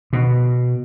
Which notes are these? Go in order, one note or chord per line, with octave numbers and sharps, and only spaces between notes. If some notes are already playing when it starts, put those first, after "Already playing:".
B2